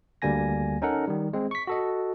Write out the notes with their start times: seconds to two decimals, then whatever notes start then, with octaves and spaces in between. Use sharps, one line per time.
0.22 D2 D3 G3 A#3 G#5 A#6
0.82 C#4 D#4 A4 A#4 F#5
1.08 D#3 G3
1.33 G#3 C4
1.51 C#6 B6
1.67 F#4 A4 D#5